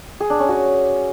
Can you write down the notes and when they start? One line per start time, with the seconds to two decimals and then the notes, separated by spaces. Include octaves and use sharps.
0.20 G#4
0.30 D4
0.39 C#4
0.49 F#4